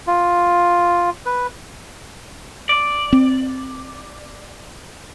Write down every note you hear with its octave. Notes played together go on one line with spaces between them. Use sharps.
F4
B4
D5
C4